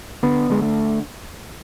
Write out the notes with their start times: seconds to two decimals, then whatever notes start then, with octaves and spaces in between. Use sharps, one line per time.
0.23 D3 B3
0.50 D3 G#3
0.62 A3